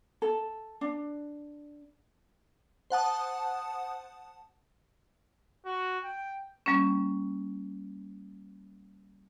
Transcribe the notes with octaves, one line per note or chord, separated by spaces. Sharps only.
A4
D4
C5 F#5 A5 D#6
F#4
G5
G3 A#3 C#4